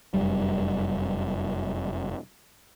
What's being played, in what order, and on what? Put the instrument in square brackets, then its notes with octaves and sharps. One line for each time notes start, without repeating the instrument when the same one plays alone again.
[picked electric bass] F1 F#2 G3